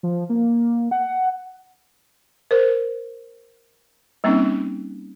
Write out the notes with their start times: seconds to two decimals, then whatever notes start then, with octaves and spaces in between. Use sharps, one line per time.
0.03 F3
0.29 A#3
0.91 F#5
2.51 A#4 C5
4.24 G3 A#3 C4 C#4 D#4